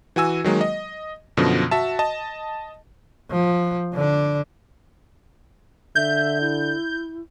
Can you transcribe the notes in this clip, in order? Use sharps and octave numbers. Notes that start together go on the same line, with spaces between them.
E3 F#4 G#5 E6
D#3 F#3 G#3 A#3
D#5
F#2 B2 D3 F3
F#4 E5 A5
D#5 A5
F3
D3 D4
D3 E5 G6
E4